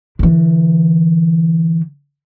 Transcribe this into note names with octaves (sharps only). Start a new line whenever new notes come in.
D3 E3